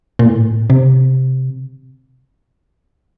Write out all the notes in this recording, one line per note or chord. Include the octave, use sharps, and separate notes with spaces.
A#2
A2
C3